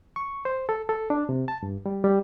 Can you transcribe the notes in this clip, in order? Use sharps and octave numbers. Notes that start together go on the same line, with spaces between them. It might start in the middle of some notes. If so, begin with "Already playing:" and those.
C#6
C5
A4
A4
D4
C3
A5
G2
G3
G3